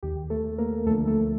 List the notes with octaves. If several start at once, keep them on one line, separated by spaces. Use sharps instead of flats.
D#2 D#3 G4
A3 A4
A#3 A#4
D2 D3 F3 A3 A4
A3 A4